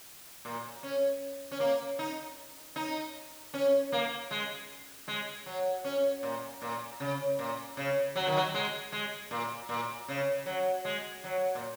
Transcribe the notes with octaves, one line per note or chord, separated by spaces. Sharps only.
A#2
C#4
C#4
A#3
D#4
D#4
C#4
A#3
G#3
G#3
F#3
C#4
A#2
A#2
C#3
A#2
C#3
F#3
D#3
F#3
G#3
G#3
A#2
A#2
C#3
F#3
G#3
F#3
A#2